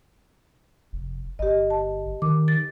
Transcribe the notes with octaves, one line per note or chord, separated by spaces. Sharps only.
F1
G1 G4 D#5
A5
D#3 D6
A6